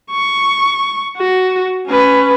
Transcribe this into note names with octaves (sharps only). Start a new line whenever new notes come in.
C#6
F#4
C#4 B4